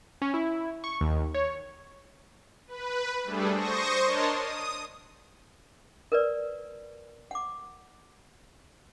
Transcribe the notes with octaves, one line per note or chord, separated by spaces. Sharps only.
C#4
E4
C#6
D#2
C#5
B4
G3 A3 D4 G#4 A4
C5 C#6 D#6 A#6
D4 A#4 C#5 D#5 A5 C6
D#6
A#4 B4 D5
F#5 D6